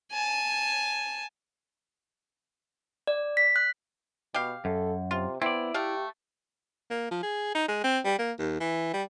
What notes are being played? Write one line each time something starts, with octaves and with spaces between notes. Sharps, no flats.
G#5 A5
D5
B6
F#6
B2 G4 F5
F#2 A4
C3 F4
B3 C4 E4 D5
A3 G4 F5
A#3
F3
G#4
D#4
G#3
C4
G3
A#3
D#2
E3
G3